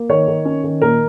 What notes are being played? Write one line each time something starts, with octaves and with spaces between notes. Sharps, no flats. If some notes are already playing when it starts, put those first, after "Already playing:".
Already playing: A#3
D#3 C#5
D#3
C#4
D#3
A#2 A#4